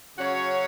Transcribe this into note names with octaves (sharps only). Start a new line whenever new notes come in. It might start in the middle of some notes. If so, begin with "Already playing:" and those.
C#3 F#3 C#4 F#4 C#5